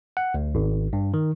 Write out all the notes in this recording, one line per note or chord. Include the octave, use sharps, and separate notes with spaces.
F#5
D2
G#1
G2
D#3